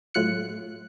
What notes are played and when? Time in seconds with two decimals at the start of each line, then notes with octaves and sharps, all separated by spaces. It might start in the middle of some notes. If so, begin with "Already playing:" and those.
0.14 A2 F#3 F4 F#6 C#7